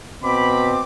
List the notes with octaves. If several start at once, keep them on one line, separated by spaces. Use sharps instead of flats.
B2 C4 B5 D6